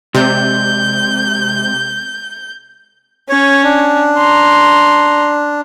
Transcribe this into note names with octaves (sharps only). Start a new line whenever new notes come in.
C3 G#3 F#4 D5 G6
C#4 C#5
D4
A#5 C6